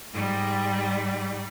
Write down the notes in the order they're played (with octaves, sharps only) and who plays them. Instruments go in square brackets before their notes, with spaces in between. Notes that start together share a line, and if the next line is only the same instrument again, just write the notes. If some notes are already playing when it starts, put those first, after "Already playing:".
[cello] G#2 G3